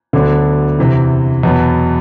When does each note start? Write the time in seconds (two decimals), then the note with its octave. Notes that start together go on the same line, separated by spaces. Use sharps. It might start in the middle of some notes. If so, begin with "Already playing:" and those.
0.13 D2 D3 F#3 B3 D4
0.78 E2 C3 E3
1.43 E2 B2 F#3 B3